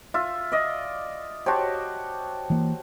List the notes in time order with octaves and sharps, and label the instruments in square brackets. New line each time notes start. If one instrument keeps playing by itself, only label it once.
[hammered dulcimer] F4 [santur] E5
[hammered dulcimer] D5 D#5
[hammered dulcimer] F#4 G4 [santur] C5 C#5 A5
[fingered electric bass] E3 A#3